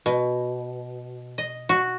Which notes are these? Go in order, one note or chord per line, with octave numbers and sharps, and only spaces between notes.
B2
D#5
F#4